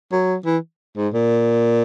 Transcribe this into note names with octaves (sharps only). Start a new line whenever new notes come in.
F#3
E3
G#2
A#2